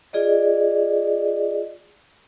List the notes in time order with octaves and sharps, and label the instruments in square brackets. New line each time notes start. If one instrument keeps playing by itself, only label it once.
[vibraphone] F4 G#4 D5 D#5